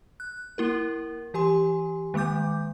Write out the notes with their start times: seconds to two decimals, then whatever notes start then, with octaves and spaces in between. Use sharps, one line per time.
0.20 F#6
0.58 A#3 E4 A#4
1.34 E3 G4 G#5 C6
2.14 D#3 G#3 A#3 D6 G6